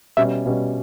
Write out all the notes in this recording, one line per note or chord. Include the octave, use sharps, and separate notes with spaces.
B2 G3 C#4 E5
B2 G3 C#4